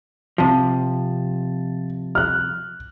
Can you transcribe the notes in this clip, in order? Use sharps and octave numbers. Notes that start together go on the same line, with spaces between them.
C3 F3 A5
F6 F#6